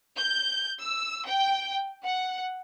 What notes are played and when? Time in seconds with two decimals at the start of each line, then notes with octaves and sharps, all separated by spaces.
0.17 G6
0.80 E6
1.27 G5
2.03 F#5